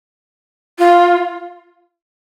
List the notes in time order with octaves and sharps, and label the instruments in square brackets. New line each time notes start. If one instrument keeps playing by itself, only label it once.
[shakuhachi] F4